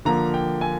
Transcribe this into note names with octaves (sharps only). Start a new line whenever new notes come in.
D3 F3 A#3 A#5
G5
G#5